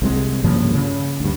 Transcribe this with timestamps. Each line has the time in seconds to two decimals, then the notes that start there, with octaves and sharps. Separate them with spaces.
0.02 C2 C3 E3 G#3
0.44 G2 C#3 F3 A#3
0.74 C#3
1.20 D2 G2